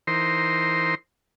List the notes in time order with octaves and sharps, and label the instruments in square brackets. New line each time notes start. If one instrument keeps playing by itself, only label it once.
[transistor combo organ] E3 D#4 A#4 C5 C6